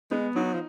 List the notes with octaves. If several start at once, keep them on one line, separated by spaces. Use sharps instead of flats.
G#3 B3
F#3 D#4
F3